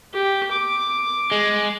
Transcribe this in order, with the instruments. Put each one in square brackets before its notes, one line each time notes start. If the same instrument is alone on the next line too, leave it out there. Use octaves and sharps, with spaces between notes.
[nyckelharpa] G4
D6
[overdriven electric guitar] G#3